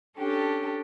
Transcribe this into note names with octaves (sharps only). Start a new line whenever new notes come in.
C#4 D4 G4 A4